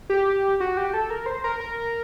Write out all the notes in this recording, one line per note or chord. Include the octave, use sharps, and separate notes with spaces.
G4
F#4
G4
A4
A#4
C5
A#4
A#4